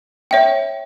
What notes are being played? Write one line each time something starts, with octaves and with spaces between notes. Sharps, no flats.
C#5 E5 G5